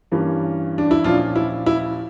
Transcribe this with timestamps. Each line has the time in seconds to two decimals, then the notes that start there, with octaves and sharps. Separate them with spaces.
0.12 G2 E3 A#3 C#4
0.78 D4
0.91 E4
1.04 A#2 F3 C#4 D4 F4
1.36 E4
1.66 E4